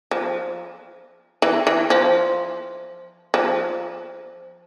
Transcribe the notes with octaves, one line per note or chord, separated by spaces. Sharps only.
F3
E3
E3
F3
F3